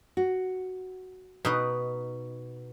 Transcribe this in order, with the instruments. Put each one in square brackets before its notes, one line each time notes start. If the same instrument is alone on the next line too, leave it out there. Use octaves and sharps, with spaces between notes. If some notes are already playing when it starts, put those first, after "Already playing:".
[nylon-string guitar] F#4
[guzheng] B2 D#4 B4